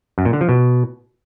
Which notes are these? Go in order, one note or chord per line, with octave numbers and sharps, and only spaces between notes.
F#2
A#2
D3
F3
B2